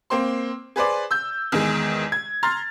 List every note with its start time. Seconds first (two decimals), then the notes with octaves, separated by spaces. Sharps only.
0.10 A#3 C4 C6
0.76 G#4 B4 C5 D5
1.11 E6 G6
1.52 E2 D#3 G#3
2.12 G#6
2.43 A#5 C6 F6 A6